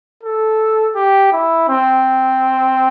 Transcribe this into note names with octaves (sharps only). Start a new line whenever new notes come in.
A4
G4
E4
C4